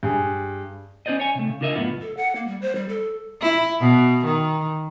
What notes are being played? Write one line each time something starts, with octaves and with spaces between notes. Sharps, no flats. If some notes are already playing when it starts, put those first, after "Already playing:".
G2 G#4
C#4 F4 C5 D5 D#5
C#5 G#5
C3 A3
C#3
D4 F4 A#4 D#5 E5
C#2 F#2 A2 B3 F4
A4
F#5
A#3
G3
C5
G3
A4
E4
B2
D#3